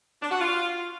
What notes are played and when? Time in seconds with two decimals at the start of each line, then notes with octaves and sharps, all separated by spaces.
0.22 D4
0.31 F#4
0.40 F4